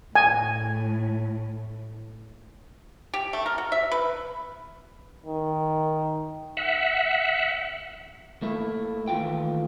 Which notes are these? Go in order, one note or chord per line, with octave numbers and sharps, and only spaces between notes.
A2 G#5
G4
A3
A#4
F#4
E5
B4
D#3
E5 F#5
A3 A#3 E4
D#2 E3 A3 F4 G5